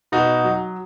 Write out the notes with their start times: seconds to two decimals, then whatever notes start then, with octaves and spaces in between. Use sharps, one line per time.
0.12 B2 D#4 F#4
0.44 F#3